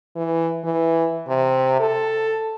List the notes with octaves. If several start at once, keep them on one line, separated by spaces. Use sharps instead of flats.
E3
E3
C3
A4